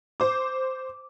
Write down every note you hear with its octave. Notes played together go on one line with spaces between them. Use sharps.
C5 D6